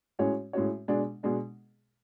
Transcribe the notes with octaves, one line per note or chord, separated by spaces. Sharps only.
A2 G#3 C#4 F#4 C#5
A2 G#3 C#4 F#4 C#5
B2 G#3 D4
B2 G#3 D4